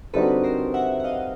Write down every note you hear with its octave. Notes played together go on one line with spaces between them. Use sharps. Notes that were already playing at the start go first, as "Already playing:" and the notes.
D3 G3 C4 D#4 F#4 A4 B4
A#4 C5
E5 F#5
F#5
D#5 F5